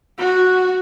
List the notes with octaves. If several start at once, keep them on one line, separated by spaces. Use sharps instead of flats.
F#4